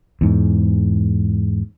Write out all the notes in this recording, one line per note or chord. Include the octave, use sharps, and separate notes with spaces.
E2 G#2